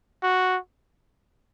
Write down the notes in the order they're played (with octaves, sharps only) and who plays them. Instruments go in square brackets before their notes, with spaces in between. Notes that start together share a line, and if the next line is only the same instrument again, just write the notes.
[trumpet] F#4